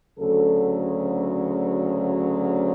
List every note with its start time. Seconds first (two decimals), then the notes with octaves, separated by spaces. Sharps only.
0.18 D2 C#3 F#3 A4